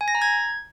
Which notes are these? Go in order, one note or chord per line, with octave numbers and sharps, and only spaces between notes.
G#5
A#6
A#5
G#6